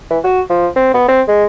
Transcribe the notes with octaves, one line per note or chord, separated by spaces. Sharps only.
E3
F#4
F3
C4
B3
C4
G#3